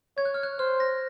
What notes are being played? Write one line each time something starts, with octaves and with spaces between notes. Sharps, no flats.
C#5 G#6
F#6
F6
F#6
C5 F6
A#6